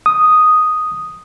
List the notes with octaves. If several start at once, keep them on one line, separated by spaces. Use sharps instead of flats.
D#6